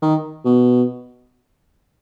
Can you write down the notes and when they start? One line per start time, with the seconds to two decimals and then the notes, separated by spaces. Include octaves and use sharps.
0.02 D#3
0.45 B2